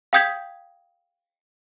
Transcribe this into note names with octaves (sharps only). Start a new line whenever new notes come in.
F5 G5 D#6 G6 G#6 B6